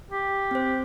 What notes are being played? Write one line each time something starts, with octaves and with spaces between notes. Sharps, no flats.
G4
C4 C5